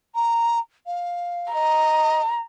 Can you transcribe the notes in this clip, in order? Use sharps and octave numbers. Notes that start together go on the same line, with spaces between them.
A#5
F5
D#5 A#5